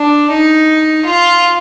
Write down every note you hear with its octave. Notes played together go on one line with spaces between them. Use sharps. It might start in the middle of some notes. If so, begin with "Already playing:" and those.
Already playing: D4
D#4
F4